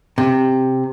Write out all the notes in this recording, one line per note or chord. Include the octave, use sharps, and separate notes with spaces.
C3